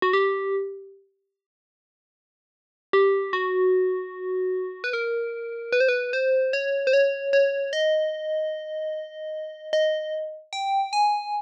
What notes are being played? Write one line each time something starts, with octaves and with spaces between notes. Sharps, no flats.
F#4
G4
G4
F#4
B4
A#4
B4
C5
B4
C5
C#5
C5
C#5
C#5
D#5
D#5
G5
G#5